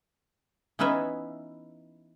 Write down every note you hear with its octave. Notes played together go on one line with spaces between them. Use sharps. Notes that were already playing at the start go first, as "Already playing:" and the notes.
E3 B3 C#4 D#4 B4 E5